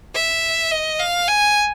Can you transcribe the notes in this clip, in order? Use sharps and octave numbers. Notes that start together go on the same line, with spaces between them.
E5
D#5
F5
G#5